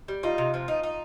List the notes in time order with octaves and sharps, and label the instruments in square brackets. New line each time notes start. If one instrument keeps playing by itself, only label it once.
[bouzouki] G3
[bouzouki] D#4 [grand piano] F4
[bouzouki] C3
F3
D#4
D#4